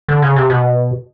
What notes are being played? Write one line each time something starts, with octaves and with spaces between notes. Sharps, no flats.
D3
C#3
C3
B2